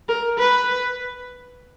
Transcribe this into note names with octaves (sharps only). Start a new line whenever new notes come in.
A#4
B4